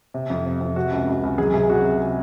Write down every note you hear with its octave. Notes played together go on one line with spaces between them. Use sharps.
C3
F2
C3
F2
C3 F#4
C#2
C#2
C#2
F#3 G#4
C3 G#4
C3 F#4
C3